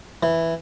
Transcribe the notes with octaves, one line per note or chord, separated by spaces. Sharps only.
E3